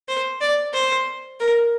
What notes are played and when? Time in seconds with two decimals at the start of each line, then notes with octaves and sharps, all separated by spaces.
0.08 C5
0.41 D5
0.74 C5
1.40 A#4